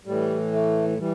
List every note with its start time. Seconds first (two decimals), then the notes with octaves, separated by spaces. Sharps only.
0.05 A2 E3 G3
0.53 A3
0.98 E3 G3